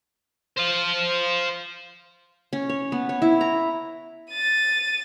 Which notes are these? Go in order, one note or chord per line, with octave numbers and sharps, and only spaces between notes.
C5 F5
C#4
C#5
B3
C#5
E4
A#5
A6 D#7